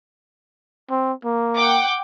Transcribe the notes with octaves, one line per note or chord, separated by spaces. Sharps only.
C4
A#3
F#5 G5 D6